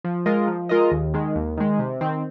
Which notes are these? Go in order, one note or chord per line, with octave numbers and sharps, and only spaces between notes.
F3
G#3 F4 A#4 D#5
F3
G#3 F4 A#4 D#5
D#2
D#3 G#3
D#2
D#3 G#3
C3
D#3 C4